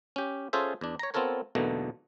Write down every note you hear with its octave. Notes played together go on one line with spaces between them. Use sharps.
C#4 G4
C#4 F4 G#4 A4 C5 E5
E2 D4
C#5 A#5
B3 C4 F4 A4 A#4 C#5
B1 E2 B2 D3 A3 A#3